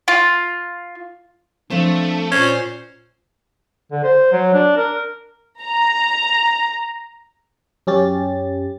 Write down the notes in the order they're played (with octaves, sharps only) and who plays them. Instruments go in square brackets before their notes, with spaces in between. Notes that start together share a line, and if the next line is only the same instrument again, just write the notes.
[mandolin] F4
[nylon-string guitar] F3 C4 C5 [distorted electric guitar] A3 [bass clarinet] D4
[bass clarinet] A#2 [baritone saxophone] C#4 [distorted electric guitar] C5
[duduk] D3
C5
F#3
D4
A#4
[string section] A#5
[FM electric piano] F#2 C#4 G4 A6